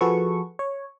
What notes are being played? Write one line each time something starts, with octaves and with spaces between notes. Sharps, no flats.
F3 F#4 G#4 A4 B4 C#6
C#5